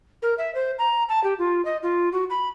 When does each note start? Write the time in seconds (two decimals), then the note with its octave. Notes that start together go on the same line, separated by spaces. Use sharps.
0.22 A#4
0.38 E5
0.55 C5
0.78 A#5
1.09 A5
1.24 G4
1.39 F4
1.65 D#5
1.82 F4
2.12 F#4
2.30 B5